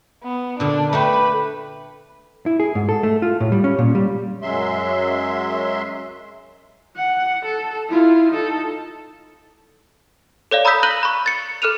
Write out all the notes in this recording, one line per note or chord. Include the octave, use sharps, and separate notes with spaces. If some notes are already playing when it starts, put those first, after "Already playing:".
B3
A#2 D3 D4
A3 D4 G4 B4
E4
G#4
G#2
A4
A3
F4
A2
G3
C#4
A#2
G3
F#2 F#3 G#3 E5 C6
F#5
A4
E4 F4
D#4 A4
A4 C#5 D5 F5
A#5 B5 D#6 E6 G6 B6
F#6 G6 A#6 D#7 F#7 G7
B5 C#6
A6 C#7
A4 F6 F#6 D#7 F7